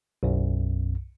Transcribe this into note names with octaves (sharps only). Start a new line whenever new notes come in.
B1 F#2